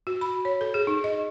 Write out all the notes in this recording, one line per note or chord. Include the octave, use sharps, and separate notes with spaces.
F#4
B5
C#5
A4
G#4
D#4
D#5